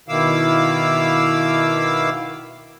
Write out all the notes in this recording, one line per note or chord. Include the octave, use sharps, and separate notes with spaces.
B2 D#3 E4 F5 D6 E6